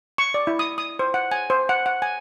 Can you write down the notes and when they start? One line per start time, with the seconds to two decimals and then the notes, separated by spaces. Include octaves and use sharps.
0.18 C#6
0.34 D5
0.47 E4
0.59 D#6
0.78 D#6
0.99 C5
1.14 F#5
1.32 G#5
1.50 C5
1.69 F#5
1.86 F#5
2.02 G#5